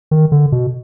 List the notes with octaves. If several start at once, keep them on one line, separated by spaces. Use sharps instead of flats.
D#3
D3
B2